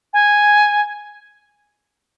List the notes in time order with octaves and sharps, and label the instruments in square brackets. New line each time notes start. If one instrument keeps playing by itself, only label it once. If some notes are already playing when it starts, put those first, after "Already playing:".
[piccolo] G#5